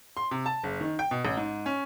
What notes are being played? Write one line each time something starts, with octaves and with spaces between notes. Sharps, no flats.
C6
C3
A5
F#1
D#3
G5
B2
A1
G#2
C#4